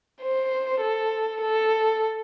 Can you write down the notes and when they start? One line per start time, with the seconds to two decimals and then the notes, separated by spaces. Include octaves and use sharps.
0.22 C5
0.81 A4
1.41 A4